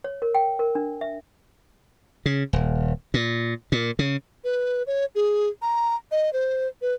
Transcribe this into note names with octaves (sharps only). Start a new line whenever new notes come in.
C#5
A#4
G5
A#4
D4
E5
C#3
D#1
A#2
A#2
C#3
B4
C#5
G#4
A#5
D#5
C5
B4